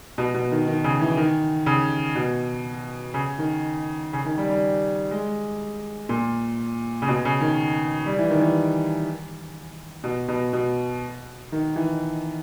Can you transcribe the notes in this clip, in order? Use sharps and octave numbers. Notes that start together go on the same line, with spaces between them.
B2
B2
D#3
D#3
C#3
E3
D#3
C#3
B2
C#3
D#3
C#3
D#3
G3
G3
G#3
A#2
C#3
B2
C#3
D#3
G3
E3
D#3
E3
B2
B2
B2
D#3
E3